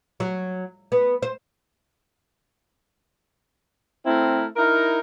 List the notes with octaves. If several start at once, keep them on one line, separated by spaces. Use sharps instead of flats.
F#3
B3
C5
A3 C4 E4 A#4
D#4 E4 A#4